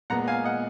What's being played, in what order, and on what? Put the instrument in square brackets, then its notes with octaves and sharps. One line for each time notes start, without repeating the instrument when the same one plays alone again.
[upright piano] A#2 G#3 B3 [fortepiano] F#5 A#5
[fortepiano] F5 G#5
D#5 F#5